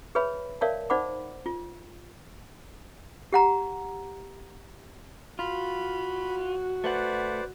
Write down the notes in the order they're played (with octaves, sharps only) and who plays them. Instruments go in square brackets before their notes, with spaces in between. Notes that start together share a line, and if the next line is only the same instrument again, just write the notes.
[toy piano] G#4 B4 C#5 E5 B5
A#4 C#5 D5 E5 F5 A5
D#4 C5 D5 F#5 B5 D6
F4
G4 F#5 A#5
[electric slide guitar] F4 [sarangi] F#4 [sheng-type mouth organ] B5
[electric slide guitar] A3 F#5 [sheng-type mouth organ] B4 C5 D5